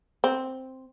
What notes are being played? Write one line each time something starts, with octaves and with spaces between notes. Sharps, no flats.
C4